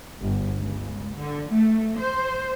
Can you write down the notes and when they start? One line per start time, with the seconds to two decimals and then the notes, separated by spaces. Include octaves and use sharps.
0.21 G1
0.56 C#2
1.16 D3
1.50 A3
1.98 C5